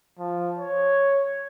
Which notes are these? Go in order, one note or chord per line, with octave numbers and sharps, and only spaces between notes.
F3
C#5